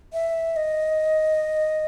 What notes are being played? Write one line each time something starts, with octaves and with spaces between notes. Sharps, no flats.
E5
D#5